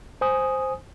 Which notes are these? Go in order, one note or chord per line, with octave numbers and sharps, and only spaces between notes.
C5 G#5 D#6